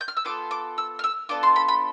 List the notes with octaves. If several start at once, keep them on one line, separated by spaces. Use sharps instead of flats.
G6
F6
E6
B3 F4 A4 D6
D6
E6
F6
E6
B3 D4 F4 A4 D6
C6
B5
B5